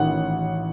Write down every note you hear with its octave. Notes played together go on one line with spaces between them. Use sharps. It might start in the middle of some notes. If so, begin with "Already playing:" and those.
Already playing: A1 D#3 F#5